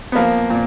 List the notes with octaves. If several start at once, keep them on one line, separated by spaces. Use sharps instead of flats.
B3
F3 A#3
A#2